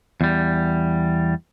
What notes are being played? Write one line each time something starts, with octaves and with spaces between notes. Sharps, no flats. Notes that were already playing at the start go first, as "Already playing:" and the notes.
E2 G3